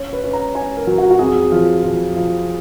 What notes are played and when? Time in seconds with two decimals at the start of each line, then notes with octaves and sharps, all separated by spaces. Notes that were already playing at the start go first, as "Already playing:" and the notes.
Already playing: C#4 C#5
0.13 B4
0.24 C#4
0.33 A#5
0.55 C#4 G#5
0.77 A#4
0.87 F#3
0.98 F#4
1.10 F#4
1.19 F2 G#4
1.52 F3
1.83 F3
2.16 F3